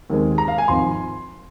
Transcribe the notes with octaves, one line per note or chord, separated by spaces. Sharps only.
D#2 D#3 G#3 C4
A#5
F5
G#5
G#1 G#2 F3 C4 C6